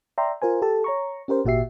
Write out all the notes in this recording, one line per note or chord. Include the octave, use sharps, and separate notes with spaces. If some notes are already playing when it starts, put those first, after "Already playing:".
D5 E5 G5 A#5 C6
F4 A#4 C5 G#5
G4 A4 A5
C#5 A#5 C#6
C#4 G4 A#4 C5
G#1 A#2 F#4 G4 E5 C7